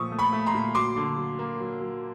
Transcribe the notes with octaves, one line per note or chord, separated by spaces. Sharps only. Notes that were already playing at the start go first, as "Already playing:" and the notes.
Already playing: A#2 F3 A3 C#6 D#6 E6
A3
B5 C#6
A3
A#5 C6
A#2
F#3 C6 D6
D3
F#3
A#3
F#3
F#3